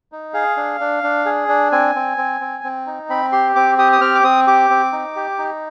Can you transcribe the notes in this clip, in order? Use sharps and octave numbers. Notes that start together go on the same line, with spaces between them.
D#4
G#4 F5
D4
D4
D4
G#4
D4
C4 G#5
C4
C4
C4
C4
D#4
C4 B5
G4 C6
C4 D6
G4 D#6
D#6
C4 F6
D6
C4 D#6
G4 D6
C4
D#4
G4
D#4